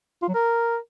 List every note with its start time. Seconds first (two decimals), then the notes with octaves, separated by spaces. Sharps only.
0.22 F4
0.28 F#3
0.34 A#4